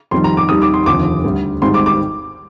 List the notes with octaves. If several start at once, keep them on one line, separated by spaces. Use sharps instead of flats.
F2 D#3 G3 C6
A#5
D6
D#2 D#3 G3 D#6
D6
C6
F1 D#2 D3 F3 D6
D2 D3 G3
G#1 G#2 G3 C6
D6
D6